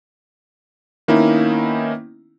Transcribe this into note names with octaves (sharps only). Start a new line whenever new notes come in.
D#3 A#3 B3 C#4 D#4 E4